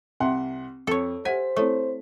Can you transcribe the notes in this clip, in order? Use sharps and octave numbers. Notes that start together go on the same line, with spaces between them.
C2 C4 E5 F#5 G5 C6
F2 A4 C#5
G4 C5 E5 F#5 G#5 B6
A3 C4 E4 C#5